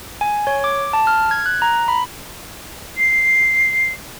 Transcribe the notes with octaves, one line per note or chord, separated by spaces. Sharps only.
G#5
C#5
D6
A5
F6
G#6
F#6
A#5
B5
C7